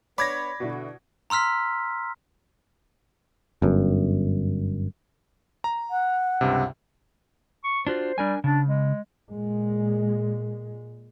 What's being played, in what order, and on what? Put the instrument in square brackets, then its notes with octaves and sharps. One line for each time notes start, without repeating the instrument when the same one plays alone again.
[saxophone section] B3 D4 C#5 [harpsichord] D5 [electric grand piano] B5 G#6 A#6
[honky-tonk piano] B2 D4 E4 [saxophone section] D3 F#4
[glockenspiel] A#5 C6 E6 F6 B6
[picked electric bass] G1 F#2
[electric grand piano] A#5
[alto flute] F#5
[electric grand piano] C#2 G2 C3
[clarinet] C#6
[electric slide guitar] D4 F4 F#4 [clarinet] C5
[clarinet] G3 [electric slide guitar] D4 A#4 G#5
[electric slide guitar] C#3 [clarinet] D4
[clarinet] G#3
[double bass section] A#2 G#3